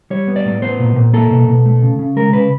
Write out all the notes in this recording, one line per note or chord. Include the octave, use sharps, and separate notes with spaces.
G3 C#5
B3
D5
A2
B3 C5
A#2
A#2
A#3 A4
B2
B2
A3
C#3
C#3
G#3 A#4
C#3 B4